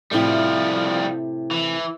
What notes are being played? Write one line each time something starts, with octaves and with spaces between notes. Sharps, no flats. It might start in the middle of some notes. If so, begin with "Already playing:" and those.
A2 C3 F3 G3 E4
E3